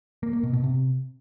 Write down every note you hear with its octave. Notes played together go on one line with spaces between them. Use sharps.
A#3
A#3
B2
B2
C3